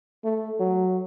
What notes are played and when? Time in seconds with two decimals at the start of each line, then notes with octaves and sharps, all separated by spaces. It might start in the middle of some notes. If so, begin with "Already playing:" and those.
0.24 A3
0.60 F#3